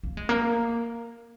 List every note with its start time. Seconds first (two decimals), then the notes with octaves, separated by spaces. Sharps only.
0.03 A#3
0.17 G#3
0.29 A#3